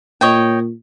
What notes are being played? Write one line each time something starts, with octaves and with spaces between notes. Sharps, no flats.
A#2 C#5 D#5 G5